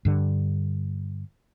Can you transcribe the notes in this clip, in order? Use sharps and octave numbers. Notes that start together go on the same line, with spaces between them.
G2 D3